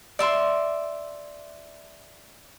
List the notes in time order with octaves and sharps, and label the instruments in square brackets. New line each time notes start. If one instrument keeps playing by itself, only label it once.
[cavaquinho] D5 E5 C6